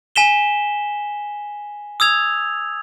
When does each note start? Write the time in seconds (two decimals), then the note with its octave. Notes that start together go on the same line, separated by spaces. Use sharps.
0.16 G#5 B6 E7 G7
2.00 D#6 E6 G#6 F7